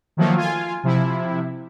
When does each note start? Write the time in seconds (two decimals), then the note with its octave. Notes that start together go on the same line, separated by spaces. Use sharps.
0.17 D#3 F3 F#3 A3 A#3
0.36 F4 G#5
0.84 C3 F3 E4